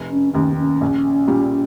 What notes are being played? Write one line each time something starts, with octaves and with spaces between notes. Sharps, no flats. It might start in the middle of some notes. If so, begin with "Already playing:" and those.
Already playing: F1
C#4
D#2 D#3 C#4
C4
C#4
A#1
A#2 G3